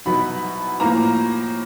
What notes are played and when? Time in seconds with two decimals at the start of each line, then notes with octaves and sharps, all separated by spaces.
0.06 C2 B2 F#3 B3 D#4 B5
0.80 A2 F3 A#3 A#5